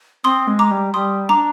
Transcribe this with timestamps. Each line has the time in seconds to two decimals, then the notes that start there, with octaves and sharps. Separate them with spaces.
0.24 C4 C6 D#6
0.47 G#3
0.59 A#5 D6
0.71 G3
0.94 G3 C6 D#6
1.29 D4 A#5 D6